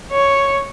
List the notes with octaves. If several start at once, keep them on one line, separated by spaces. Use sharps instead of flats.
C#5